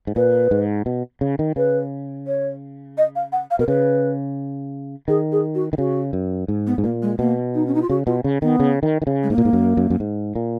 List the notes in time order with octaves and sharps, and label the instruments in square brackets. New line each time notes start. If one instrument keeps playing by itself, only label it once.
[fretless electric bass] G#2
[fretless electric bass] A#2 [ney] B4
[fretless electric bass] G#2
B2
C#3
D#3
[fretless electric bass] C#3 [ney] B4
[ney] C#5
D#5
F5
F#5
F5
[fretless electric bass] B2 [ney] A#4
[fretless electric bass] C#3 [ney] B4
[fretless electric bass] D#3 [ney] G#4
[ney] G#4
F#4
[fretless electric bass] D#3
[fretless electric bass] C#3 [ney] F#4
[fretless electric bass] F#2
G#2
[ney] B3
[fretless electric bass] G#2
[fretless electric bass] A#2 [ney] A#3
[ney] G#3
[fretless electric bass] B2 [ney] A#3
[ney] D#4
C#4
D#4
F4
[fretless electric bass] C#3 [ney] F#4
[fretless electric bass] B2 [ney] F4
[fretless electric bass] C#3
[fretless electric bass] D#3 [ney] B3
[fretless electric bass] C#3
D#3
D#3
C#3
[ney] G#3
[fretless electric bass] G#2 [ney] A#3
[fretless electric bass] A#2
G#2
F#2
F#2
F#2
G#2
A#2